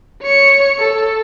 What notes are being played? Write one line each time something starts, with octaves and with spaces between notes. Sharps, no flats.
C#5 C#7
A4